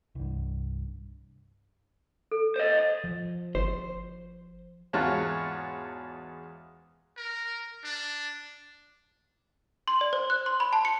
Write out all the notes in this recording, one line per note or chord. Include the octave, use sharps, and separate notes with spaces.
C2 G2
A4
C5 D#5
F3
G1 C5
E2 G#2 F4 F#4 C#5 A5
A#4
D4
C6
D5
C5
F#6
C6
B5
A5
C#7